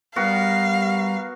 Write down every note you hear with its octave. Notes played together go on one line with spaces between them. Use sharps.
G3 B3 F#4 A#4 F5